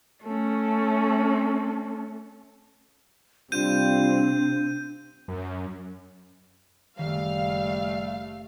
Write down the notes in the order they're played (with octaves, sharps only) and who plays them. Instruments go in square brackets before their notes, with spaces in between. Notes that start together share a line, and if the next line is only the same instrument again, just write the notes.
[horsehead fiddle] A3 C#4
[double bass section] C3 C4 [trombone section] G3 F4 [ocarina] D4 [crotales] G6 D#7
[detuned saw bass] F#2
[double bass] F#1 A3 [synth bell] D#3 [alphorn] G3 [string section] F5